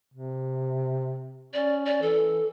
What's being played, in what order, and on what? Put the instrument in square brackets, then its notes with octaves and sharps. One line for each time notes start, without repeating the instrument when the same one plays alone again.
[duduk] C3
[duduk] C#4 [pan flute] D5
[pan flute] D5
[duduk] E3 [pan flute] A4